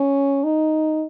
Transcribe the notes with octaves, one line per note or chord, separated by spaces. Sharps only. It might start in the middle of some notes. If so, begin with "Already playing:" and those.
Already playing: C#4
D#4